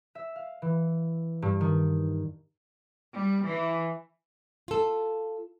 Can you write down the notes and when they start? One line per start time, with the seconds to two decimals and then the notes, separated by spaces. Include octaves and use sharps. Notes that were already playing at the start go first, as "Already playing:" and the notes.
0.15 E5
0.36 F5
0.62 E3
1.42 G2
1.61 D#3
3.14 G3
3.45 E3
4.68 F4 A4